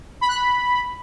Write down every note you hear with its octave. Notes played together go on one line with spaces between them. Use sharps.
B5
F#6
B5